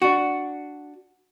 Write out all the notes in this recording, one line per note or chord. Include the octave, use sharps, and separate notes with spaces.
D4 F#4